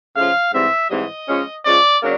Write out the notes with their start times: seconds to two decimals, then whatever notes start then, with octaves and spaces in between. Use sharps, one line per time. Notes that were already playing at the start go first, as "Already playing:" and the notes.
0.15 C#3 F3 A3 C#4 F4 F5
0.53 G#2 E3 G3 C4 E5
0.90 G#2 E3 G3 C4 D#5
1.28 F3 G#3 C#4
1.64 F3 G#3 C#4 D5
2.01 C#3 F#3 A#3 D4